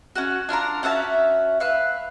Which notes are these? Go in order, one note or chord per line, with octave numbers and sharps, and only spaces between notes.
C#4 F#4
D4 F4 A#4 A#5
C#4 F#4 E5 A5
B4 E5 F5 F#6